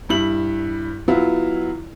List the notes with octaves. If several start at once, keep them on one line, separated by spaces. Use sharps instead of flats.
G2 E4 F#7
F#3 B3 E4 F4